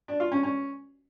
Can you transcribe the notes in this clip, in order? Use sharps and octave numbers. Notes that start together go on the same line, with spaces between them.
D4
F4
C#4
C#4